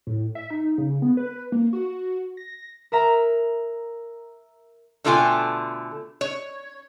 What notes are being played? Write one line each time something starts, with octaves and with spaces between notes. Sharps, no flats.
A2
E5
D#4
C#3
B3
B4
A#3
F#4
A#6
A#4 E5 A#5
B2 D3 A3 F4 G5 G#5
C#5